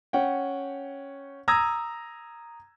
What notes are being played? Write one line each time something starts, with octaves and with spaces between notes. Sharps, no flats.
C#4 F#5 G5
A#5 D#6 E6 G#6 A#6